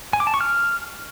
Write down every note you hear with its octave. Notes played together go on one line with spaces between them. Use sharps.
G#5
D6
A5
C#6
F6